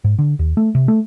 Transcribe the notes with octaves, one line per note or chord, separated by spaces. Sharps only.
G#2
D3
D#2
A3
C3
A3